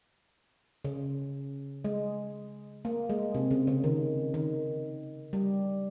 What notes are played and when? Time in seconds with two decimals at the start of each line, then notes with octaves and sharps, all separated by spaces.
0.85 C#3
1.85 G#3
2.85 A#3
3.10 G#3
3.35 C3
3.51 C#3
3.67 C#3
3.84 D#3
4.34 D#3
5.33 G3